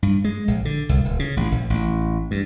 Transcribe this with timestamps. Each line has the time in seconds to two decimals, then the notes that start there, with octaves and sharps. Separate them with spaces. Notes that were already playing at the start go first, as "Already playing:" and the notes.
0.03 G2
0.24 G#3
0.48 A#1
0.65 D3
0.89 C2
1.05 D1
1.19 C#3
1.37 A1
1.52 A#1
1.70 A1
2.31 G2